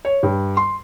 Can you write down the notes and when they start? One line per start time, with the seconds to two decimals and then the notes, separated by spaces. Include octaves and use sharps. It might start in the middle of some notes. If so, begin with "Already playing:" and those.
0.05 C#5
0.23 G2
0.57 C6